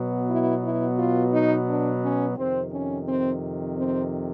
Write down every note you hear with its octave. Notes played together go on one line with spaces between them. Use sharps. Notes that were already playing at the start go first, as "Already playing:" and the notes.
Already playing: B2 F#3 B3
E4
E4
F4
D#4
D4
C#4
F2 C3 D#3 C4
C#4
C4
C4